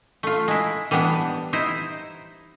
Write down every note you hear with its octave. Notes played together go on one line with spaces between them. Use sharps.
A3 F4
G#3 E4
E3 G3 B3 D4
D#4 E4 C5